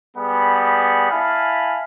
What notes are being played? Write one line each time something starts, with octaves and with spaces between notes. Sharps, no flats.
G3 B3 G#4 F#5 B5
E4 F5 G#5 A5 B5